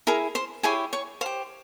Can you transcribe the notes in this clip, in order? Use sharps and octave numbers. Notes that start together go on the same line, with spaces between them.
E4 G#4 A#4 A#5
C5 C6
E4 G4 G#4 C#5 G#5
C#5 C#6
G4 C5 F5